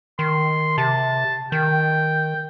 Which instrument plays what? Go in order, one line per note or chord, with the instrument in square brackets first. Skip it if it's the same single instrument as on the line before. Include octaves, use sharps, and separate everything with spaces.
[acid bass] D#3 [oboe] C6
[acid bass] C3 [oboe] A5
[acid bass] D#3 [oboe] G5